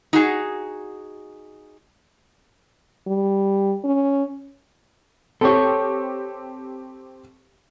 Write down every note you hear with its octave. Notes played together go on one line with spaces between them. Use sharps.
D#4 F#4 G#4
G3
C#4
C4 G4 A4 C#5